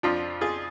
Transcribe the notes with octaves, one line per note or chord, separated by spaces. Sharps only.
F2 F3 D4 F4
F4 G#4